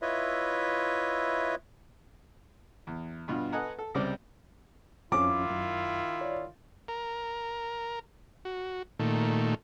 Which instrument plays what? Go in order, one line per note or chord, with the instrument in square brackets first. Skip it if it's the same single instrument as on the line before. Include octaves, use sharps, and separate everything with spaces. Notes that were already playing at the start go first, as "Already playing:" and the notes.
[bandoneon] E4 F4 B4 C#5 D#5 E5
[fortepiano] E2
G2 B2 F4
A4 B4 D#5 F#5 G#5 A#5
A4
C#2 C3 G3 G4 C5 D5
[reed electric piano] F2 F3 C#4 [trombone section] D#3 E4 F4 [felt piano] D6
[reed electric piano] F#2
C#5 D5
[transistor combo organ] A#4
F#4
A#2 D#3 A3